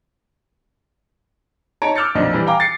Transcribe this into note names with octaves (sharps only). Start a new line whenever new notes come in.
D#4 C#5 A5 A#5 D7
D6 E6 F6 G6 A6 C#7
B1 F2 A#2 F3 D4 D#5
E3 G3
F5 G5 G#5 A#5 D6
A6 C7 C#7